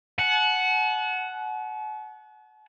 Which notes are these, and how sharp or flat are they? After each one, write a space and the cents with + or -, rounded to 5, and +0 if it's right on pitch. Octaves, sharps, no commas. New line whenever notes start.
F#5 +0 A5 -45